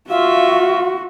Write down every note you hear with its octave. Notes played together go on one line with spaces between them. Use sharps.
F4 F#4 E5 F5